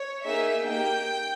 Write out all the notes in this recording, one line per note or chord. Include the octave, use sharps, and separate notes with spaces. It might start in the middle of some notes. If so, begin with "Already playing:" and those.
Already playing: C#5
A#3 D#4 G#4 E5
A#3 D#4 G4 G5